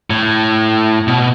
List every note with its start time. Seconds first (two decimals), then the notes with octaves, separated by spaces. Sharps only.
0.10 A2
1.07 B2